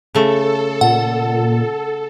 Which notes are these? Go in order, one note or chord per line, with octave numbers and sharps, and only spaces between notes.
C#3 A3 A4
A#2 F#5